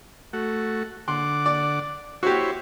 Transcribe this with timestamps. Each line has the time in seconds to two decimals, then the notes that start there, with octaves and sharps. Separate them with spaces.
0.33 A3 F#4
1.08 D3 F#5 C6 D6
1.46 D5
2.23 E4 F#4 G4 C5 C#5